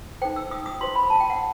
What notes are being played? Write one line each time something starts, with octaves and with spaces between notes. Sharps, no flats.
D#4 A4 C5 G5
E6
D#6
D#6
F#4 C5 C6
B5
A5
G5
F#5